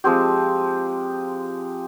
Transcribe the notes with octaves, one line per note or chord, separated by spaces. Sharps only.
F3 G#3 C4 G4